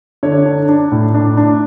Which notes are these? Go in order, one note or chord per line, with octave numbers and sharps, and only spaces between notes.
D3 C#5
D4
D4
A2
D4
D4